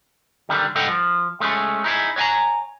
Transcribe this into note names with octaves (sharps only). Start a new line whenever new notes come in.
D3 D#3 G3
G2 A4 D#5 F#5 G5
F3
G#3 A3 C#4
D#4 E4 G#4
C#5 D#5 F#5 G#5 A#5